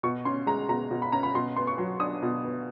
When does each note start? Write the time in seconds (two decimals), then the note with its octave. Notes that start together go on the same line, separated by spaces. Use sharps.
0.03 B2 C#6
0.25 C#4 C6
0.47 G#3 A#5
0.69 B2 A#5
0.91 B2
1.02 B5
1.12 C#4 A#5
1.23 B5
1.35 B2 C6
1.56 B3 C6
1.67 C#6
1.78 F#3
2.00 D4 D#6
2.22 B2
2.44 B3